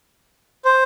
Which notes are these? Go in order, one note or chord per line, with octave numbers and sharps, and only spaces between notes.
C5